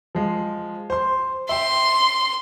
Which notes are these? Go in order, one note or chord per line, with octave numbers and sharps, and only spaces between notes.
F3 G#3
C5 C6
E5 G5 C6